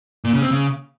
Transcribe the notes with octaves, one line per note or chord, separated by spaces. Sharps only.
A#2
C#3
C4
C#3